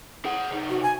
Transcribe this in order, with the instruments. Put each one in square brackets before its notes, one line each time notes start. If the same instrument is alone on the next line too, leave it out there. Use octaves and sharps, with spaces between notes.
[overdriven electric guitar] G#4 F#5
C3 D#4
[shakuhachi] F#4
G#5